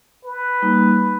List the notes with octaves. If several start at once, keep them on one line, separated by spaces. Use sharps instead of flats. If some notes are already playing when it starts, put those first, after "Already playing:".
B4
G3 A#3 D#4